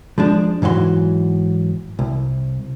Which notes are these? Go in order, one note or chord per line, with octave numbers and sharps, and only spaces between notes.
F3 G#3 D4
G#2 E3 F#3 E5 C6
C2